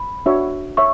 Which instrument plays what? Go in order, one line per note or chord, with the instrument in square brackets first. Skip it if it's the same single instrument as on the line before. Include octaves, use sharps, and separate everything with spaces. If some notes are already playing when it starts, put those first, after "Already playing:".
Already playing: [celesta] B5
[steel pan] D4 F#4 C#5 E5
[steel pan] C#5 E5 [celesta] C#6